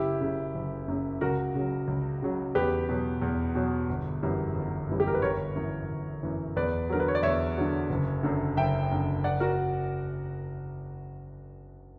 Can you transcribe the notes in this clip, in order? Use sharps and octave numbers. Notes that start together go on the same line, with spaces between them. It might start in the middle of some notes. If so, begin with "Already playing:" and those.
Already playing: F#1 E4 G4
F#2 C#3
F#1
F#2 C#3
C#2 F#4 A#4
C#3 F#3
C#2
C#3 F#3
E2 G4 B4
B2 F#3
E2
B2 F#3
G1
F#2 E3 G3
G1
F#2 E3 G3
G4
A#4
B4
G1 A#4 C#5
F#2 E3
G1
F#2 E3
E2 B4 D5
D3 F#3 A#4
B4
C#5
D5
E2 C#5 E5
D3 F#3
F#1
F#2 D3
F#1 E5 G5
F#2 D3
F#1 D5 F#5
F#4 A#4